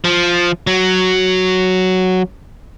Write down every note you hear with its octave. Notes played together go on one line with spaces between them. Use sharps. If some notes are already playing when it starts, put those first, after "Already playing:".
F3
F#3